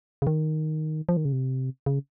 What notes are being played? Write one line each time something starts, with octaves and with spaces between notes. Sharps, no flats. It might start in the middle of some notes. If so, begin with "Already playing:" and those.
C#3
D#3
F3
D#3
C#3
C3
C#3